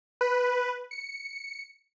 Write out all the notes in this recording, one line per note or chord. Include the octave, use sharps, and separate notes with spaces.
B4
C#7